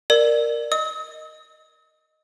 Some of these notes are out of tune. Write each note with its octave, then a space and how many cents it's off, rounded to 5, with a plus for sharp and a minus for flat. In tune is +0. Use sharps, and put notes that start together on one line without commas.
A#4 +0 D5 +20
D#5 +0 D#6 +45